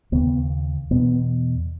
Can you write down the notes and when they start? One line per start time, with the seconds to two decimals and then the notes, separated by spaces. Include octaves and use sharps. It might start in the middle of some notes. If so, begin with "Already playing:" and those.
0.12 D#2 C#3 B3
0.91 E2 B2 B3